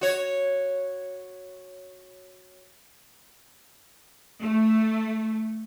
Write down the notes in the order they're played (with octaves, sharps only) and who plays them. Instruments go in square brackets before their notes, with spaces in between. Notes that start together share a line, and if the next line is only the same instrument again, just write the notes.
[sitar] F#4 C#5
[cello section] A3